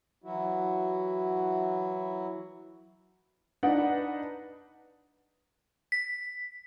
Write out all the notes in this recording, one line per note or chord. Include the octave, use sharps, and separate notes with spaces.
E3 F#3 E4 F#4
D4 D#4 B4 F#5
B6